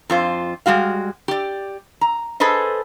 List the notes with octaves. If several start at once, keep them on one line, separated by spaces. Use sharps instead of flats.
F2 F4 C5
G3 G#3 F#4 F5
G4 D5
A#5
G#4 A4 B4 C5 D#5